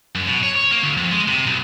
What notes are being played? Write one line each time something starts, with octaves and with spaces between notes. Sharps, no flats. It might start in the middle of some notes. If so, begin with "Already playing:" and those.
F#2
B2
C#5
C#5
A#3
D2
F2
G#3
C3
B1